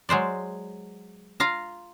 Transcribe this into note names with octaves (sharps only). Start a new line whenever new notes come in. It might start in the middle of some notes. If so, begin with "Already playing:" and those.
F#3 G#3 C5 D5
F4 F5 A#5